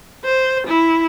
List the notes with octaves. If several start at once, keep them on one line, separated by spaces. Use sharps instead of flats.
C5
E4